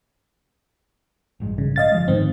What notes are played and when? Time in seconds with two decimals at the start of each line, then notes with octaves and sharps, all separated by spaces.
1.40 A1 G2 G#3
1.58 C#3
1.76 D#5 F5 A6
1.92 D3 F3 G#3
2.08 G#2 D#3 C4